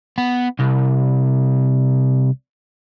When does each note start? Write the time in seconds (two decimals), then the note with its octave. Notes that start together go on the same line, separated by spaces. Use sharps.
0.18 B3
0.60 C2